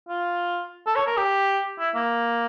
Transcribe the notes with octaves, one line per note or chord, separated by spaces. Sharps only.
F4
A4
C#5
A#4
G4
E4
A#3